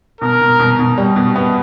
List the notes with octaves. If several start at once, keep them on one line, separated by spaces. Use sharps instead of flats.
B2 A#4
B2
B2
B2
G3
B2
B3